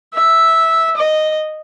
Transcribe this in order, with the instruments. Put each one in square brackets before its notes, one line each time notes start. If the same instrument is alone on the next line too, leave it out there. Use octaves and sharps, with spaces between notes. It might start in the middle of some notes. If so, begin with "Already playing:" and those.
[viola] E5
D#5